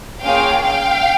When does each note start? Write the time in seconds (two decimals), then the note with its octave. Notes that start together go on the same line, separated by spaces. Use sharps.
0.21 A#3 C#4 F4 G#4 F5 G5
0.63 F5 G5